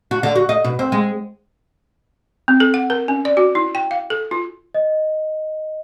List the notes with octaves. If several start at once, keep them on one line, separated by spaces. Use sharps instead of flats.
F#4
D3
F#4
D#5
B2
C4
G#3
C4
A4
F#5
A#4
C#4
D5
F#4
E4
G5
F5
A4
F4
D#5